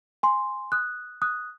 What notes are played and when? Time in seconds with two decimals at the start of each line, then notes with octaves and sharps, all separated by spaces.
0.23 G#5 C6
0.72 D#6 F#6
1.22 D#6 F#6